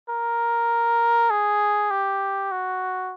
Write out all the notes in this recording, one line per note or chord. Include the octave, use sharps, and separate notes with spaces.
A#4
G#4
G4
F#4